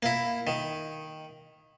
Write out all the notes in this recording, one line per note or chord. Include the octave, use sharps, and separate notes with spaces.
A#3 E4
D#3